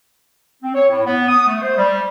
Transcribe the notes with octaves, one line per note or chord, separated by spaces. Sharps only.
C4
C#5
A2
B3
D#6
A3
C5
G3